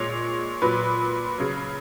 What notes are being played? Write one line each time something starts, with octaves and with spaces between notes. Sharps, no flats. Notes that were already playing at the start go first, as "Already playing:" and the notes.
Already playing: A#2 G#3 C#5
A#2 F#3 B4
C#3 F#3